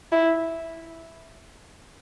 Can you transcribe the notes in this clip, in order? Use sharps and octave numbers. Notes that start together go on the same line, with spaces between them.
E4